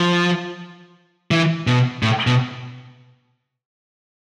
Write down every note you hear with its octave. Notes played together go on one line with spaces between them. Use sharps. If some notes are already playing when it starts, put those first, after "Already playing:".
Already playing: F3
E3
B2
A2
B2